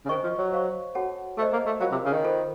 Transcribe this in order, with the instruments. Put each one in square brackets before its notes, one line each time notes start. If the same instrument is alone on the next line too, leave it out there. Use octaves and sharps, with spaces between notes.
[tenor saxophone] C#3
[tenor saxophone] D#3 [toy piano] C5 D#5 A#5 C#6
[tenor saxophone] F3
F#3
[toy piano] C5 F5 A#5 C#6
F#4 A4 C#5 F#5 A5
[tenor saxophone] A3 [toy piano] A4 C5 D#5
[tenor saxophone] A#3
A3
[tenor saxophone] F#3 [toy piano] F4 A#4 F5 A#5
[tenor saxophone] C3
C#3
D#3
[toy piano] F4 A4 C5